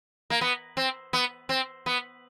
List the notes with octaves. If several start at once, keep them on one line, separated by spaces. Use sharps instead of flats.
A#3
B3
C4
B3
C4
B3